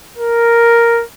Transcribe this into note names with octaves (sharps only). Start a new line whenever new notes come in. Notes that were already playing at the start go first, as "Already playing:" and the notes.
A#4